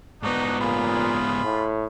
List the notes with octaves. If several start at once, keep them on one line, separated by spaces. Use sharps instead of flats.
G#2 B3 D4 D#4 F#4
A#2 F4 G#4 B5
A2